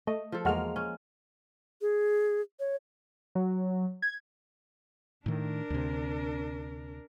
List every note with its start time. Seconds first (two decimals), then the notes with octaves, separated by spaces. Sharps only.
0.07 A3 D#5
0.32 F3 A4
0.45 E2 G#3 A#3 F#4 F6
0.76 C#4
1.81 G#4
2.60 C#5
3.35 F#3
4.02 G#6
5.26 A2 D#3 D4 A#4
5.70 D2 C3